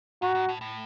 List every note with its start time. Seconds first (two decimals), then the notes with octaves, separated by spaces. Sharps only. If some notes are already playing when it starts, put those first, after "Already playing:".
0.22 G#2 F#4
0.35 G#2
0.49 A2
0.61 A2